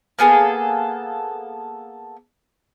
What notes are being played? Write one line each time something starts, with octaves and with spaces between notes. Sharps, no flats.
A#3 B3 G#4 A4